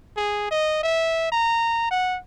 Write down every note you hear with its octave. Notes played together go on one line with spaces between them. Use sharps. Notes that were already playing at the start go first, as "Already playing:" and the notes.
G#4
D#5
E5
A#5
F#5